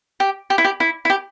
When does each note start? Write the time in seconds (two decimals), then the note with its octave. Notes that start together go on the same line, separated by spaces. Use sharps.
0.20 G4
0.50 G4
0.58 E4
0.64 G4
0.80 E4
1.05 E4
1.10 G4